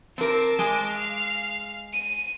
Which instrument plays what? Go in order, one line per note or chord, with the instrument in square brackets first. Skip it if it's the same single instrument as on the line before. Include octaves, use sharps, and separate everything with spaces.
[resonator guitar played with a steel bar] C4 A#4 [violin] A5 D6
[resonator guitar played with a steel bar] G#3
[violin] F5
D#7